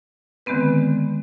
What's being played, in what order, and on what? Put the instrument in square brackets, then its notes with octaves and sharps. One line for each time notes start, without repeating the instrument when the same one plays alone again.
[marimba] D3 D#3 G#3 B3 C4 B4